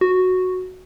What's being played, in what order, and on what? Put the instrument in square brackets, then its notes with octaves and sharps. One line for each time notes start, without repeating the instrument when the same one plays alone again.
[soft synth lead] F#4